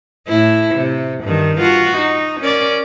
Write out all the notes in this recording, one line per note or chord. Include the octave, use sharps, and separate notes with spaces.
A2 E4
C3
G2 D#3
F4 F#4
D#4
C#4 A#4 D5